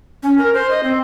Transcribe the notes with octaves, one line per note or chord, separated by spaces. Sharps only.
C#4
A#4
C5
D#5
C4